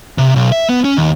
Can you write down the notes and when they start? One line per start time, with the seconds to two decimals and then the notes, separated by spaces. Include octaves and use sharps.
0.18 C3
0.36 B1
0.52 E5
0.69 B3
0.85 C#4
0.97 D#2